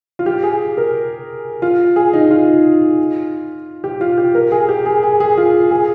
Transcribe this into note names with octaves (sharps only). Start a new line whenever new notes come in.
F4
G4
G#4
A#4
F4
G#4
D#4
F4
G4
F4
G4
A#4
G#4
G4
G#4
G#4
G#4
F4
G#4